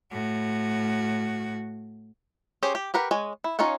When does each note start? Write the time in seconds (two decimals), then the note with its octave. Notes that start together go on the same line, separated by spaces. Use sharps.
0.12 A2 F#4
2.63 C#4 G4 G#4 C5
2.75 G4
2.94 G4 A#4 B4 F#5
3.11 G#3 C#5 G#5
3.44 E4
3.59 C#4 D#4 F4 C#5 F#5